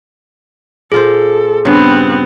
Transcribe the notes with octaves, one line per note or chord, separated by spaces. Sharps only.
A#2 F4 G#4 A4 C5
G2 C#3 B3 C4